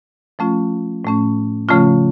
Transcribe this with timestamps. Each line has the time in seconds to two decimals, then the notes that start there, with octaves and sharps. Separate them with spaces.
0.39 F3 A3 C#4 F4
1.05 A2 A3 C#4
1.69 C#3 F3 A3 C#4 F4